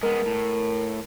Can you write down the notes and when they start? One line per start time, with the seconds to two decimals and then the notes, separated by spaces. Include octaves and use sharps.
0.03 G#3 B3 A#4
0.26 A2